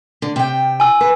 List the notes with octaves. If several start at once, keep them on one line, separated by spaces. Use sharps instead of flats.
D3
C3 G5
G#5 E6
B4